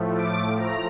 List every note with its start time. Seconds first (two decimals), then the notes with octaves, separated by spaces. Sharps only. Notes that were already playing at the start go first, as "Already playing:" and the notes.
Already playing: A2 F3 A3
0.15 D6
0.57 A#5